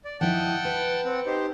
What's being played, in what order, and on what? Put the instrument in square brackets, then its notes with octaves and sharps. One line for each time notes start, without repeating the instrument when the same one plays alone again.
[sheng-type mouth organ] D5
[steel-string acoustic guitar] F3 E4 D#5 [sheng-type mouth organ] F#5 G5 A5
[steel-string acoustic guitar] B4
[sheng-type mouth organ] C4 F#5
D#4 G4 C5